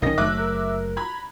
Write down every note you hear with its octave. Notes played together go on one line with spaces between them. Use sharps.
B1 D#3 C#4 D#5 A#6
F#1 F#3 A3 E5 D6 F#6
A#4
A#5 B5 G#6